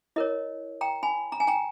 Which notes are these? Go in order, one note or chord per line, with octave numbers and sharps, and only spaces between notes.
E4 A#4 C#5 D#5
G5 A#5
G#5 B5
A#5
G#5
G5 A#5